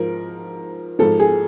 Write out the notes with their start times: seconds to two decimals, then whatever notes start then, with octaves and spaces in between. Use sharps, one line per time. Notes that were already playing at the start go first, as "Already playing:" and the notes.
Already playing: G#2 F3 A#4
0.99 G#2 F3 A4
1.20 G#4